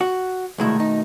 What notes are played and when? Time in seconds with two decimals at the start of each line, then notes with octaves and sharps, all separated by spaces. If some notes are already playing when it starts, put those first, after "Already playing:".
0.01 F#4
0.58 C2 B2 D#3 G#3 A3 E4
0.80 D#4